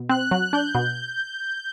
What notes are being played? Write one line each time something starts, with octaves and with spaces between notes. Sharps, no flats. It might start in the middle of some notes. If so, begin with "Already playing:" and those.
Already playing: B2
C4 F#6
F#3
D4 G6
B2